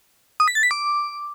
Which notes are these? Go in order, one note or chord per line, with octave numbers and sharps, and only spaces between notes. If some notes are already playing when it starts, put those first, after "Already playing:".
D#6
B6
A6
B6
D6